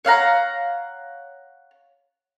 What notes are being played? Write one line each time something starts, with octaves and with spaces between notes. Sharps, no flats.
C#5 F5 F#5 A#5